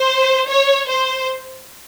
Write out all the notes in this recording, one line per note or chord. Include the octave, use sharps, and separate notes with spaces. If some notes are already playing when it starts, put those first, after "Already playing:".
Already playing: C5
C#5
C5